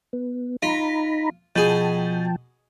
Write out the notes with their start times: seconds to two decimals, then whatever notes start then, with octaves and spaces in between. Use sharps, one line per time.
0.13 B3
0.62 D#4 F4 A#5 B5
1.56 B2 F3 G#4 G5 A5